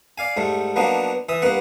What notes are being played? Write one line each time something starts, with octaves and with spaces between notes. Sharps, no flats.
D5 F5 G#5
G#2 G3 A3
F3 F#3 A#3 B3 D4 D#4
E3 E5 D#6
G2 A#3 B3 F#5